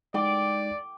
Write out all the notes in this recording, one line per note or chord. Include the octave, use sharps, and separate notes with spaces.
G#3 D#4 D5 G5 D6